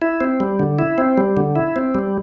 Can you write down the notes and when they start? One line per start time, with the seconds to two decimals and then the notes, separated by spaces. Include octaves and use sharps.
0.02 E4
0.21 C4
0.40 G3
0.59 D3
0.79 E4
0.98 C4
1.18 G3
1.37 D3
1.56 E4
1.76 C4
1.95 G3